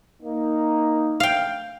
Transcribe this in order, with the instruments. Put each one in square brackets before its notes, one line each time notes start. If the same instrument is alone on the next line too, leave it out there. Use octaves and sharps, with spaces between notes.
[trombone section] A#3 D#4
[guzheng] F5 G5